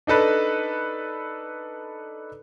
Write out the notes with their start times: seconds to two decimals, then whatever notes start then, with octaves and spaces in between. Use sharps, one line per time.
0.07 D4 D#4 A4 B4